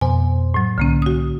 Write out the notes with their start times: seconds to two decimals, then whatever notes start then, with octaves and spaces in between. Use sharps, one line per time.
0.01 F2 B2 C5 G#5
0.54 A2 F#3
0.78 C2 D3 A#3 C#4
1.02 F#4 D#6